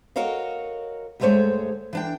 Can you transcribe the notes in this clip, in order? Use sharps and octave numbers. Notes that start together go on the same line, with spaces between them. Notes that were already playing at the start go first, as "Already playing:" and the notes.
F#4 A#4 C#5 D#5 F5
D2 G2 G#3 A3 C5 C#5
E3 D4 G5